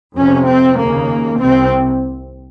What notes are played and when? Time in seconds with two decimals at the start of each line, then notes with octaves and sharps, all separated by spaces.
0.16 F2 C3 C#4
0.47 C4
0.77 D#2 C#3 A#3
1.39 C2 C3 C4